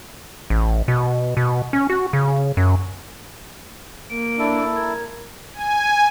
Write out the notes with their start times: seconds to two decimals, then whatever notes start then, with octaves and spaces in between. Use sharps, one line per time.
0.50 A1
0.88 B2
1.37 B2
1.73 C#4
1.90 F#4
2.13 C#3
2.57 F#2
4.10 A#3 D7
4.39 D4 E4 A4
4.76 A#4 G#6
5.54 G#5